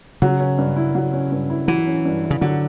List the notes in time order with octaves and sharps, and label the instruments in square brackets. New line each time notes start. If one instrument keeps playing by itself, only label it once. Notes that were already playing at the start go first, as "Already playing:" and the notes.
[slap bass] C#3 [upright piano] F#3
[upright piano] C#4
G2
E4
F#3
C#4
G2
E4
[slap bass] E3 [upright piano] F#3
[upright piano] C#4
G2
E4
[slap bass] C#3
[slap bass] D3 [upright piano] F#3